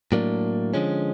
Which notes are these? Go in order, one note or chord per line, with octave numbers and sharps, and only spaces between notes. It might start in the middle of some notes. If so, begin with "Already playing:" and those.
A2 F#3 A#3 D4
D3 F3 G#3 C#4